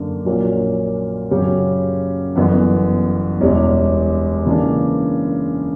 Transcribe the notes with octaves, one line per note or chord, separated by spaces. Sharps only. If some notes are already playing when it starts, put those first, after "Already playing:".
Already playing: F#2 D3 A#3 D4
A#1 A#2 F#3 A#3 C#4
F#2 C#3 F#3 C#4 G4
G1 F#2 E3 B3
E1 E2 B2 G3 C#4
C#3 E3 A#3 D4